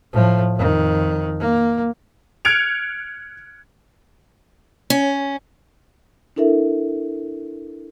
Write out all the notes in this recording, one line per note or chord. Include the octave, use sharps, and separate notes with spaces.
A2 F3
F2 D#3
A#3
F6 F#6 G#6 C#7 D7 F7
C#4
D4 E4 A4 A#4 E5